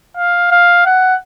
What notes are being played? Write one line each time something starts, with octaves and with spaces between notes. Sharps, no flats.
F5
F5
F#5